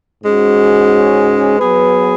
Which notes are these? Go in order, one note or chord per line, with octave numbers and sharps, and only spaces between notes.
G#2 G#3 C#4 F#4
F#3 B3 G#4 B4